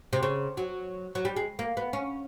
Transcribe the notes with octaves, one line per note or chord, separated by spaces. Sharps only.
C3
C#3
F#3
F#3
G3
G#3
A#3
B3
C#4